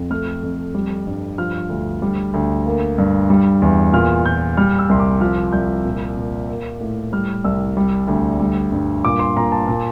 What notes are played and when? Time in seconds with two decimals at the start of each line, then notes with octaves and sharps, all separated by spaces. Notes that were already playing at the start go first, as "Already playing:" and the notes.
Already playing: F2
0.10 A3 F6
0.43 F2
0.75 G3
1.07 G2
1.38 F3 F6
1.70 D2
2.02 G3
2.34 D2
2.66 A#3
2.98 G2
3.30 G3
3.62 E2
3.93 A#2 F6
4.26 A#2 G6
4.57 G3 F6
4.79 E6
4.89 C2 C6
5.00 D6
5.21 F3 F6
5.53 C2 G6
5.85 A#2
6.17 A#2
6.49 A#3
6.81 A2
7.12 G3 F6
7.44 C2 E6
7.77 G3
8.08 D2
8.40 G3
8.72 G2
9.04 A#2 D6
9.19 C6
9.37 A#2 A#5
9.52 A5
9.68 A#2